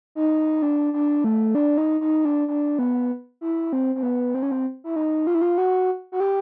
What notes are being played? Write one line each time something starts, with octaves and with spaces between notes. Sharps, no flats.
D#4
D4
D4
A3
D4
D#4
D#4
D4
D4
B3
E4
C4
C4
B3
C4
C#4
C4
E4
D#4
F4
E4
F4
F#4
F#4
G4